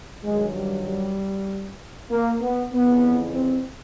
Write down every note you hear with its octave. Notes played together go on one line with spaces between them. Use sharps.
G2 D#3 F#3 G#3
G3
G3
A#3
B3
F2 C#3 E3 B3
C4